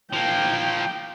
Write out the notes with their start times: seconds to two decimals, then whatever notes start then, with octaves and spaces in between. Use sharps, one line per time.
0.13 F3 A#3 G5